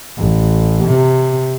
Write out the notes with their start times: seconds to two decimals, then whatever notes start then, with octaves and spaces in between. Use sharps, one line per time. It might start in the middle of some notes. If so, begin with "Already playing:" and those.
0.17 A1
0.85 C3